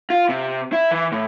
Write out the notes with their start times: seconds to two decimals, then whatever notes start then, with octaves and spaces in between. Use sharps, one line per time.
0.10 F4
0.29 C3
0.73 E4
0.91 E3
1.12 A2